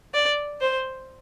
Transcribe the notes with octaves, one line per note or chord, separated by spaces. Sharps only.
D5
C5